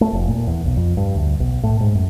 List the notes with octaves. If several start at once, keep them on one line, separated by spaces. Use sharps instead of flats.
A3
F1
A#2
E2
B1
F2
G2
D2
B1
A2
G#2
F#2